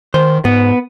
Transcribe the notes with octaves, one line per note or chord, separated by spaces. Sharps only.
D#3 C5
G#2 B3